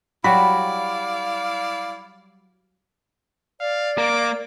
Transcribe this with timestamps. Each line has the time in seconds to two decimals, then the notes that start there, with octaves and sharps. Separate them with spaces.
0.24 F#3 G3 E4 F#4 D5 F5 B5
3.60 D5 F5
3.98 A#3 D6